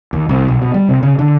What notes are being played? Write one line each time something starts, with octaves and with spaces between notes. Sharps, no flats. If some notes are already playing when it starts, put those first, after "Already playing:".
D#2
C2
B1
B2
G3
C3
C#3
D3